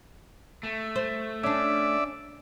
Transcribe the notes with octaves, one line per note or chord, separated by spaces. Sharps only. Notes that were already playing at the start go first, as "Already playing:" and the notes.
A3
C5
C#4 D4 D5 E5